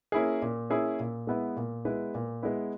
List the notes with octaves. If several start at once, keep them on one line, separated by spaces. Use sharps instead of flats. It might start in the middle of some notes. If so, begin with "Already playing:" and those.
A#3 C#4 E4 G#4
A#2
A#3 C#4 E4 G#4
A#2
G#3 B3 E4 B4
A#2
G#3 B3 E4 B4
A#2
G#3 B3 E4 B4